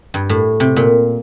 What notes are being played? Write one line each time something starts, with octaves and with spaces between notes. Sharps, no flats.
G2
A2
C3
A#2